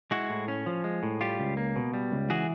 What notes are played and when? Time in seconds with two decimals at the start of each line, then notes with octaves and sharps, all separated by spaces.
0.11 G#3 E4 F#4
0.30 A2
0.48 C#4
0.66 F3
0.84 G#3
1.03 A2
1.21 G3 F4 G4
1.39 C#2
1.57 A#3
1.76 B2
1.94 G3
2.12 C#2
2.30 E3 F#4 G#4